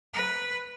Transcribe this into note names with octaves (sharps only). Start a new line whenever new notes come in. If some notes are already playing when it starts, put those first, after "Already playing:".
B4